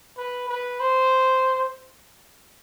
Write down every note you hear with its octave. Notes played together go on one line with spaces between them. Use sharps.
B4
B4
C5